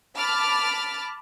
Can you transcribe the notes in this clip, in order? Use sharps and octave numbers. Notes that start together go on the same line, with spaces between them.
A5 B5 D6 F6 A6